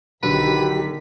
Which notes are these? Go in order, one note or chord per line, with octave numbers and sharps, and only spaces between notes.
B1 D3 D#3 F#3 G4 B4 B6